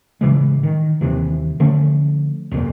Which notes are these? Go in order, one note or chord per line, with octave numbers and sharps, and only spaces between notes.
A2 C#3 E3 G#3
D#3
D#1 D#2 C3 E3
D3 F3 A3 C#4
D#1 C2 F2 A#2